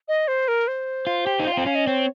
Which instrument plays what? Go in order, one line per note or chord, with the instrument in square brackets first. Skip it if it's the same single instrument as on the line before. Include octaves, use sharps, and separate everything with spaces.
[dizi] D#5
C5
A#4
C5
[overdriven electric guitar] F4
G4
D#4
F4
[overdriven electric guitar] C4 [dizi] G5
[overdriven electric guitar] C#4 [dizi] F5
[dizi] D#5
[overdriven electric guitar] C4 [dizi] C#5